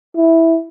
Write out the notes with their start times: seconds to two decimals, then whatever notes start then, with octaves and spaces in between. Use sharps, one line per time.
0.17 E4